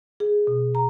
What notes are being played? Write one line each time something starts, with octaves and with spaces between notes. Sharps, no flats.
G#4
B2
A#5